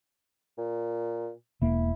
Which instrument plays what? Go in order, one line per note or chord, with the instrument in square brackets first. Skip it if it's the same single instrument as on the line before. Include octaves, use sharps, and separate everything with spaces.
[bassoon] A#2
[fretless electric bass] E1 A#3 [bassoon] E4